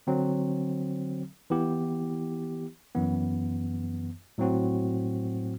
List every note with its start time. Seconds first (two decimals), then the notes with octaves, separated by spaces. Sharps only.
0.07 D3 F#3 C4
1.50 E3 B3 E4 G4
2.95 F#2 E3 B3
4.38 A2 F#3 C4 F#4